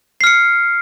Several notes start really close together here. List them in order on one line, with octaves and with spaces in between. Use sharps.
C7 F6 C#7